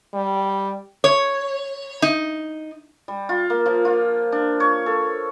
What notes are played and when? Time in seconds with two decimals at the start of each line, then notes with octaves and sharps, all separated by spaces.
0.14 G3
1.04 C#5
2.02 D#4
3.08 G3
3.29 F4
3.50 A#3
3.66 F3
3.85 F4
4.32 D4
4.60 C#5
4.86 A4